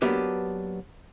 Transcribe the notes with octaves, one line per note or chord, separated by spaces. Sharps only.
F#3 A#3 B3 D4 G4 B4